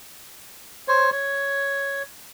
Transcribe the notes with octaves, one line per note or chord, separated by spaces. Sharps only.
C5 C#5
C#5